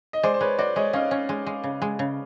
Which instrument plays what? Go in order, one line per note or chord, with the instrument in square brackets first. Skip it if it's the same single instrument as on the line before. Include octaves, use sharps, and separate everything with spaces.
[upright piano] D#5
[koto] G#3 [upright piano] C5 D5
[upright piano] C5
[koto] G#3 [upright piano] B4 C#5
[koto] F#4 [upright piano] C5 D5
[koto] G#3 [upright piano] C#5 D#5
[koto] C#4 [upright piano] D#5 F5
[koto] C#4
G#3
G#3
C#3
G#3
C#3